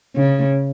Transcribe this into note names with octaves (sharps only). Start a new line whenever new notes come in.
C#3